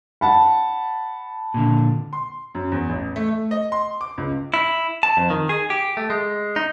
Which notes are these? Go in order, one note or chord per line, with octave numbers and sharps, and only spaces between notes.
F#5 A5 B5
A#2 D3
C6
F#2
E2
A1
A3
A3
D#5
C6
D6
C#2
E4
A5
F2
D#3
G#4
G4
A3
G#3
D#4